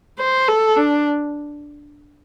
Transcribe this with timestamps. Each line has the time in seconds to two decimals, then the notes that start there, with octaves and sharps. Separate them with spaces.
0.19 C5
0.48 A4
0.76 D4